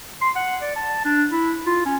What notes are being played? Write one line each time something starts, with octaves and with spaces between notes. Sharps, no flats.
C6
F#5
D5
A5
D4
E4
F4
C#4